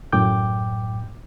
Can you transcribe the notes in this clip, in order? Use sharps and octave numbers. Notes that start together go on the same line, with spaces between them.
F#2 A2 G5 D6 G6